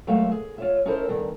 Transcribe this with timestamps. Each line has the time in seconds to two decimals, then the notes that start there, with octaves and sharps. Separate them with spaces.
0.07 D#2 F#3 G#3 A3 E5 F5
0.32 G#4
0.58 F4 C#5 E5
0.85 C#4 D#4 E4 A4 A#4 C5
1.08 E2 G2 D#3